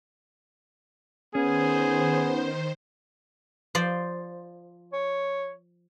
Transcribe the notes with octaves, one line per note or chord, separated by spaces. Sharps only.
D#3 B3 C#4 G#4 C5
F3 C5 D5
C#5